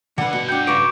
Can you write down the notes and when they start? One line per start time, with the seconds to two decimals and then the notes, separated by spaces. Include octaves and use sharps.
0.18 G2 D3 B4 F#5
0.33 B2
0.49 D4 G5 G6
0.67 C#3 F#4 B4 C#6 D6 D7